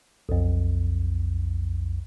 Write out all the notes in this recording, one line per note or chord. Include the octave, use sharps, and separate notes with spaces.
B1 F2